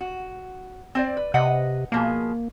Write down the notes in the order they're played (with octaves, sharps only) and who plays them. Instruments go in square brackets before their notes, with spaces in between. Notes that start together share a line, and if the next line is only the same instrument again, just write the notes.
[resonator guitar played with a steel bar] F#4
C4 C5 D5
B4
[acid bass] C3 [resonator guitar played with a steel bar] B4 D#5 F#5
[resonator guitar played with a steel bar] B2 F3 G#4 [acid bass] A#3